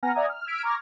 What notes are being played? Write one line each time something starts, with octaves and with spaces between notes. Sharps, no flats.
B3 F#5 G#5 A#5 F6 A#6
D5 E5 F#5 G#5 A#5 D#6
F6
E6 F6 G#6 B6 D7
A#5 C#6 D6 F6 G#6 A#6